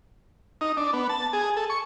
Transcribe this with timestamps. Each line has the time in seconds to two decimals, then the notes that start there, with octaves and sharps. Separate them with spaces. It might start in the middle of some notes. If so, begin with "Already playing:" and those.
0.61 D#4
0.77 D4
0.93 B3
1.09 A5
1.33 G#4
1.57 A4
1.70 C#6